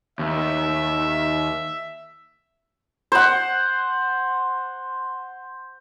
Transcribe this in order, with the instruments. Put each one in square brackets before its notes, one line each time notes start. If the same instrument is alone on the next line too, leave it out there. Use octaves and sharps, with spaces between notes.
[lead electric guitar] D#2 [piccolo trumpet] E5
[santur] C5 F#5